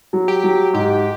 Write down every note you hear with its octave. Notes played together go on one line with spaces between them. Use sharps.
F#3
G4
F#3
G#2 G4